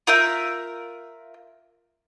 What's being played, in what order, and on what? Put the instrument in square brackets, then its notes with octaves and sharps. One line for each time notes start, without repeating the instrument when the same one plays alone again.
[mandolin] F4 A#4 E5 G6